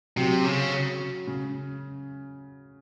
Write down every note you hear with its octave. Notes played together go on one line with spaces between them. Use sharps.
C3 F#3
C#3
C#3